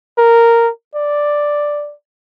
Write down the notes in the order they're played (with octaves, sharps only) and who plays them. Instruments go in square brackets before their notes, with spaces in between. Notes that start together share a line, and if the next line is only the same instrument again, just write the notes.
[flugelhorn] A#4
D5